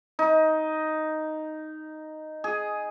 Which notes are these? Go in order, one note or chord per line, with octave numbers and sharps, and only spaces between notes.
D#4
G#4